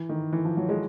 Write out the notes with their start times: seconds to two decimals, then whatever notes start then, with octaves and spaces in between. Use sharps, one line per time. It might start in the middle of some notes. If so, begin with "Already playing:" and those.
Already playing: E3
0.09 D#3
0.33 E3
0.45 F3
0.57 F#3
0.69 G#3